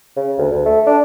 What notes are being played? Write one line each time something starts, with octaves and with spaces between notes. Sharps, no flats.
C#3
D2
D2
A3
D4